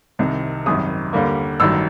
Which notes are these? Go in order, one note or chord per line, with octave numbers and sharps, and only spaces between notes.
C2 C3 D#3
G#1 F#2 D#3 G3 D#6
D#2 D3 G3 A#3
A1 G2 D#3 F#3 E6